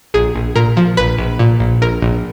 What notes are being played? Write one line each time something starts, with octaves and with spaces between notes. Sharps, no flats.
A#1 G#4
A#1
A#2 A#4
F3
A#1 B4
A#1
A#2
A#1
A#1 A#4
A#1